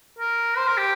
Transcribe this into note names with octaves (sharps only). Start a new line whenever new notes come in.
A#4
C5
A#4
G4